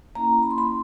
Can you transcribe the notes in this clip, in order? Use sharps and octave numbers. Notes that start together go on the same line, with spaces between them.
A#3 C#4 E4 A#5
B5
C6
B5